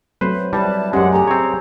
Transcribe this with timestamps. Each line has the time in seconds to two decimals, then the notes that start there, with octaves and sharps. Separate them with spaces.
0.21 F#3 A3 C4 B4 C5
0.53 G3 E4 B4 D5 A5
0.93 F#2 G#3 C#4 G4 F#5
1.12 A3 G4 G#4 A#5
1.27 C4 C#5